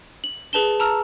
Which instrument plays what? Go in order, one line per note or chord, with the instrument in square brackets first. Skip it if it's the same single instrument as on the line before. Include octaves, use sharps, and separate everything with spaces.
[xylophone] F#7
G#4 B4 A5 E7 G7
A5 A#5 E6 F6